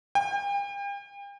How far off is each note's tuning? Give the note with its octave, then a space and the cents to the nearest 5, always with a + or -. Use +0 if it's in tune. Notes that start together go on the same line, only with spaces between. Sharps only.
G5 +40